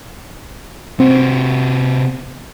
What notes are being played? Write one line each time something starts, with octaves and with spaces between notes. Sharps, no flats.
C3 C4 F#4